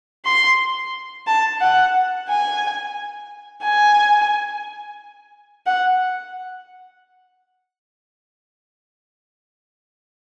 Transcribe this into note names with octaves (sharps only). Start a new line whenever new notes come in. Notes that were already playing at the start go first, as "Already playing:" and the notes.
C6
A5
F#5
G#5
G#5
F#5